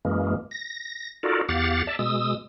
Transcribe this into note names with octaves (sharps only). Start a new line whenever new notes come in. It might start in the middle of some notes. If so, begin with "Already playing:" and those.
F#2 E3 G#3 A#3
A#6
D#4 F4 F#4 A4 A#4 D5
E2 G4 F5 F#5 A6
D5 E5 A5
B2 G#3 D#6 E6